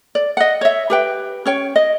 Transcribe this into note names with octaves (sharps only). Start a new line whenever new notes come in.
D5
D#5 F#5
C#5 E5
G4 B4 G5
C#4 C#5 G5
D#5